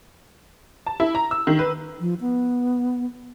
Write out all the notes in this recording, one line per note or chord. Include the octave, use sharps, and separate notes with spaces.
A5
E4
A#5
E6
D#3
B4
F3
B3